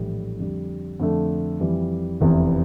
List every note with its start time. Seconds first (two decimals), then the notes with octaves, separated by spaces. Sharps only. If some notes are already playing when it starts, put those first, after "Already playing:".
Already playing: A#1 A2 E3 G3
0.39 F2 D3 G3
1.00 F2 D3 A3
1.60 F2 E3 G3
2.21 F1 E2 C3 E3